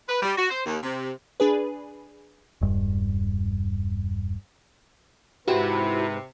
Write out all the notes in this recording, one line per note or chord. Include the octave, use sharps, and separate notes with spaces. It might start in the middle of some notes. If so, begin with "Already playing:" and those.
B4
G3
F#4
C5
D#2
C3
D4 G#4 B4
E1 G2
G#2 C3 E3 C4 E4 F#4 G4 B4